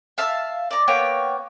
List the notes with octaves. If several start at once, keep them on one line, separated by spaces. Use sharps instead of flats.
E5 F5 A5 E6
D5 A#5
A#3 B3 C#5 G5